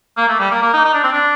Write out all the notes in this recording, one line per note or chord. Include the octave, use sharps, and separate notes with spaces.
A#3
A3
G3
A#3
A#3
D#4
D#4
D4
C4
D4